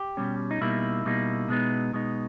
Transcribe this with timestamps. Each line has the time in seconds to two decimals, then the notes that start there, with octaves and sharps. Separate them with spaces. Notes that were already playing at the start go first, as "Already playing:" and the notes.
Already playing: G4
0.17 B2 G3 C#4
0.51 D#4
0.61 B2 G3 A#3 D#4 E4
1.05 B2 G3 A#3 D#4
1.48 B2 G#3 B3 D#4
1.93 B2 G#3 B3 D#4